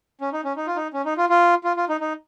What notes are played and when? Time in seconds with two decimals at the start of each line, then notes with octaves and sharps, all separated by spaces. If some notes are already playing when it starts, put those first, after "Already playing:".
0.21 C#4
0.33 D#4
0.45 C#4
0.57 D#4
0.67 F4
0.76 D#4
0.93 C#4
1.05 D#4
1.17 F4
1.29 F4
1.64 F4
1.77 F4
1.89 D#4
2.01 D#4